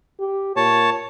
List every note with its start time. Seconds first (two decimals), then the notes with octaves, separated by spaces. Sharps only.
0.19 G4
0.56 A#2 C#5 A5